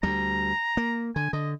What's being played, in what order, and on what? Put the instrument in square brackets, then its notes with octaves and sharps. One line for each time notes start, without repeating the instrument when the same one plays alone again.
[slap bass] D2 G3 [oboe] A#5
[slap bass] A#3
[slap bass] D3 [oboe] G#5
[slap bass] D3 [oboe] D#5